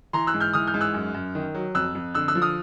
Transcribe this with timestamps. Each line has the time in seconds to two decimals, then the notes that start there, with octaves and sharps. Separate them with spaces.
0.13 E3 A#5 C6
0.27 E6 F#6
0.34 G#2
0.40 F6 G6
0.53 E3 D#6 F6
0.67 F6 G6
0.74 G#2
0.81 E6 F#6
0.94 F#2
1.14 F#2
1.35 D#3
1.55 F#3
1.75 F2 E6 F#6
1.95 F2
2.15 D3 E6 F#6
2.28 E6 F#6
2.35 F3
2.42 D#6 F6